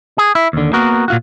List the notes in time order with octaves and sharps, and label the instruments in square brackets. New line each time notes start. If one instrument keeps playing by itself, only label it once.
[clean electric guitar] G#4
E4
D#2 D3
A#3 B3 F#4 A#4
A#2 F4 F#4